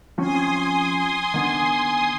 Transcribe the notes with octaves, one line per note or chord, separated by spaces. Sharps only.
F3 C4 C#4 G#5 C6 D#6
D#3 B3 D4